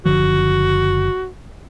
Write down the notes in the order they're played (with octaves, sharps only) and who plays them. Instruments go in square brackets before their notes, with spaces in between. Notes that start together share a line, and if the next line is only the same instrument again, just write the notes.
[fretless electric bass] F#1 D3 F3 [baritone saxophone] F#4